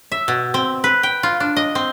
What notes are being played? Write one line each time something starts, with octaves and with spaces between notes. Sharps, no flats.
E5
B2
C4
B4
G5
F4
D4
D#5
C4